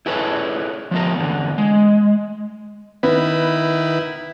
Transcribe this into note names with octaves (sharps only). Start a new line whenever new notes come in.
E4 G#4 A4 B4 C#5
F3 B3 A#4
D3 E3 B3
G#3
D#3 B3 E4